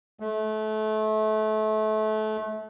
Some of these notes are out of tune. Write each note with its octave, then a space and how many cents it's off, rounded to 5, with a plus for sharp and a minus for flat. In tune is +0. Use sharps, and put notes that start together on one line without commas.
A3 -30